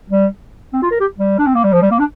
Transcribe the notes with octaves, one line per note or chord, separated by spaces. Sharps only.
G3
C4
F4
A#4
G4
G3
D4
C4
A#3
G3
F3
G3
A#3
D4